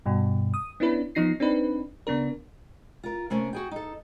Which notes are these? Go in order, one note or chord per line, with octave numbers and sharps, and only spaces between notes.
G2 B2
D#6
B3 C#4 D4 E4 B4
F3 B3 D#4 A#6 C7
C4 D4 D#4 B4
C#3 B3 D4 A#4
F4 A#4
C3 A3 A#3 C#4 A#4
F#4 G#4 G5
D#4 A4